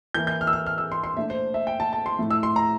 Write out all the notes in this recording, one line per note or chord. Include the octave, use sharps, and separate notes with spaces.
E3 A#3 E4 G6
G6
F6
E6
F6
F6
E6
C6
C6
A#2 A3 D4 E5
C5
E5
G5
A5
A5
C6
A2 F3 A3
E6
C6
A#5